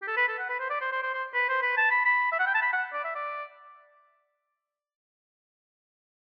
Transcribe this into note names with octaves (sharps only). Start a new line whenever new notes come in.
G4
A4
B4
A4
F#5
B4
C5
D5
C5
C5
C5
C5
B4
C5
B4
A5
B5
B5
E5
F#5
G5
A5
B5
F#5
D5
E5
D5